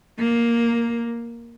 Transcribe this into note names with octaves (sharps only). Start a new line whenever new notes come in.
A#3